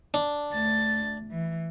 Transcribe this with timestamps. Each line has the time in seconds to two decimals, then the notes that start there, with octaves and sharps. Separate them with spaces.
0.14 D4
0.52 D2 A6
1.32 E3